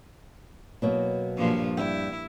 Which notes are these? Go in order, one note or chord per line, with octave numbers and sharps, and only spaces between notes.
B2 F#3 A#3
G2 A#2 F3
G2 E4 E5 G5